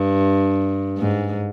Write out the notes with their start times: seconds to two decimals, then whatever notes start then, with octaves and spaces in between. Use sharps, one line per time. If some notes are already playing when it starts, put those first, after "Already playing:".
Already playing: G2
0.98 G#2